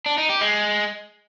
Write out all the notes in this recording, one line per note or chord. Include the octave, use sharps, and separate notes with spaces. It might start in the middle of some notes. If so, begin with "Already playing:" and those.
D4
D#4
G4
G#3